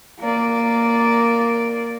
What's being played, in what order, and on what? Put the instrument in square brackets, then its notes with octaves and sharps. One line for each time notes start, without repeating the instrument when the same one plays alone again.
[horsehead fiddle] A#3 D5